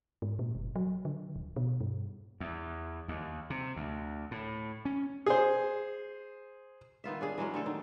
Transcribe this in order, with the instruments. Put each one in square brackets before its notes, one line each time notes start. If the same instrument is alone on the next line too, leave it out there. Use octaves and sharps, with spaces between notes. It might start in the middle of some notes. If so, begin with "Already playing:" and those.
[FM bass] G#2
A#2
F#1
F#3
D3
D1
B2
G2
[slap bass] E2
D#2
C3
D2
A2
C#4
[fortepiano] G#4 C5
[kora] D#3 B3 F4 E5
C#4 D4 G#4
E3 F#3 G#3 C#4
D3 A3 A4
D#3